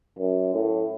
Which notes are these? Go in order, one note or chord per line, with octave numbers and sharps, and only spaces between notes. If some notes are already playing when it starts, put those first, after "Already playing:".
F#2
A2